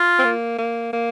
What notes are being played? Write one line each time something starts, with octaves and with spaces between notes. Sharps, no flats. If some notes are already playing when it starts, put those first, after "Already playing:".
Already playing: F4
C4
A#3
A#3
A#3